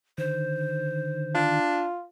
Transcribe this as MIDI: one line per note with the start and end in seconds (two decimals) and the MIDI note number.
0.18 1.60 50
0.18 1.60 51
0.18 1.38 72
1.35 1.85 62
1.35 2.04 65